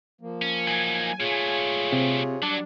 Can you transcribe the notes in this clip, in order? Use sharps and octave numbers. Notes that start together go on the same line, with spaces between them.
F3 A#3
C#4
F#3 D#4 G#5
A#2 A3 F4 G#4 C#5
C3
F#3 G3 D4